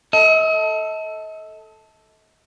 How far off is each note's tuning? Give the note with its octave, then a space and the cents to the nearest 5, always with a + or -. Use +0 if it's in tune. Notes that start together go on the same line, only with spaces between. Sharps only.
A4 +0 D#5 +40